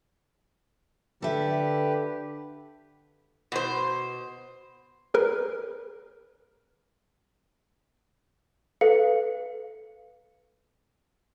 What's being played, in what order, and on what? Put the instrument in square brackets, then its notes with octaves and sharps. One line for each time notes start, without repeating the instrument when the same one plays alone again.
[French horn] D3 [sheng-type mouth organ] G4 B4 [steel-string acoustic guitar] A4 E5
[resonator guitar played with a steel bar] B2 C5
[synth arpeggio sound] G#4 A#4 B4
[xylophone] A4 B4 F5 C#7